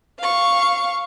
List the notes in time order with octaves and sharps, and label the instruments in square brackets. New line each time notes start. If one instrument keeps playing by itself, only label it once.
[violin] F5 C#6